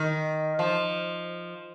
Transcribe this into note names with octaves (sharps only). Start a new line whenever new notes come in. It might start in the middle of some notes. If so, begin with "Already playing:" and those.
Already playing: D#3
F3